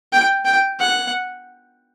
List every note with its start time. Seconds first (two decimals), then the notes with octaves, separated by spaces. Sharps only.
0.12 G5
0.45 G5
0.79 F#5